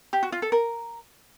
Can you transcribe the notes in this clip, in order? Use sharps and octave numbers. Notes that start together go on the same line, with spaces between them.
G4
F#4
F4
A4
A#4